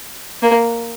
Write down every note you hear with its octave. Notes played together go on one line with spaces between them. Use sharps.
A#3